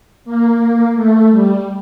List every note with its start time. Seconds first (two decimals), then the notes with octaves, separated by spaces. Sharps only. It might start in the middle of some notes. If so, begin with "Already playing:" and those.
0.25 A#3
0.95 A3
1.30 G3